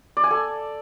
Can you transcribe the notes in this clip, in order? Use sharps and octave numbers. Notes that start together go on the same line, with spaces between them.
D5
G#5
A4